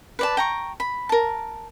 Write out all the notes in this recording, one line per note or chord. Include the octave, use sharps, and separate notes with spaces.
B4 D5 A5
G5 A#5 C#6
B5
A#4 A5